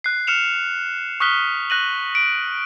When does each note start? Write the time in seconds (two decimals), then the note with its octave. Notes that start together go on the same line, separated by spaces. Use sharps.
0.04 F#6 C7
0.27 F6 C#7 E7 F7
1.20 C#6 D#6 F6 F#6 B6 G7
1.70 F#6 A#6 D#7 F#7
2.15 D7